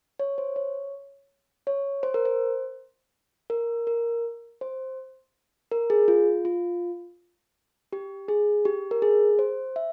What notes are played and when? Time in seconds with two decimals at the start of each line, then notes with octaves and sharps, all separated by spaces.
0.20 C#5
0.38 C5
0.56 C#5
1.67 C#5
2.03 C5
2.14 A#4
2.25 C5
3.50 A#4
3.87 A#4
4.61 C5
5.71 A#4
5.90 G#4
6.08 F4
6.45 F4
7.93 G4
8.28 G#4
8.65 G4
8.91 A#4
9.02 G#4
9.39 C5
9.76 E5